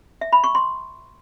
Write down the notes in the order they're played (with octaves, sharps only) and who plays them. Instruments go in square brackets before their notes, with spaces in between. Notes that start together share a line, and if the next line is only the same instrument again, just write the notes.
[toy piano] E5
B5
C#6
C6